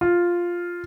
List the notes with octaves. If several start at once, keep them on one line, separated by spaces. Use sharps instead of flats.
F4